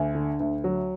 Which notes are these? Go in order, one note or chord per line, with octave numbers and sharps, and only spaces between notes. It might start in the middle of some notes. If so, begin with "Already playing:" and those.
Already playing: D2 G#5
D3
D2
F#3